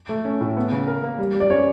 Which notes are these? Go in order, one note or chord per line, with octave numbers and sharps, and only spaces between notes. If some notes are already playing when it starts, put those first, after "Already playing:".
A3
C#4
A2
B3
C#3
A#4
A#3
G3
G3
D5
C#4 C#5